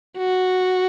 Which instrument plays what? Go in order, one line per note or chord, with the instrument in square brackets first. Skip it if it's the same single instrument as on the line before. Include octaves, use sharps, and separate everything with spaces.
[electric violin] F#4